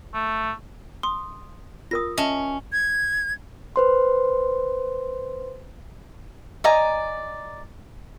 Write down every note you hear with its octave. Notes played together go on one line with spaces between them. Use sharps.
A3
C6 D#6
F4 A#4 D#6 A#6
C#4 D#5 E5 A5
G#6
B4 C5 C6
D5 D#5 G#5 A#5